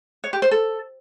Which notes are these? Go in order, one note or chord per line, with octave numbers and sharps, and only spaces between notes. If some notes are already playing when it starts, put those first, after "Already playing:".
C#5
G4
C5
A4